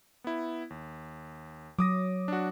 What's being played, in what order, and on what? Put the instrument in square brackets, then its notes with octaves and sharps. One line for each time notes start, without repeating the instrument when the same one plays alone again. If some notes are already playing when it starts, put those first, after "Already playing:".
[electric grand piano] B3 E4
D#2
[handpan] F#3 [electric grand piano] D6 D#6 A#6
[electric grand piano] D4 F#4